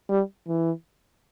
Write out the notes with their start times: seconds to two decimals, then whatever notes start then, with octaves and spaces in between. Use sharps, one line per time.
0.09 G3
0.48 E3